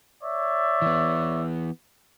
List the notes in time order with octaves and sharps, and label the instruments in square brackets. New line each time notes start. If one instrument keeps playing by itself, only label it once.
[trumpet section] C#5 D5 E5
[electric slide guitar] E3 B3